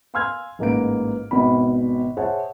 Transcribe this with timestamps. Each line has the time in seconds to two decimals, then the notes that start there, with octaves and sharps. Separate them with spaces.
0.14 F5 G#5 C6 E6 F6 G#6
0.59 A1 G#2 A#3 B4 D7
1.31 G#1 B2 B5
2.17 G#4 C5 C#5 E5 F#5 A5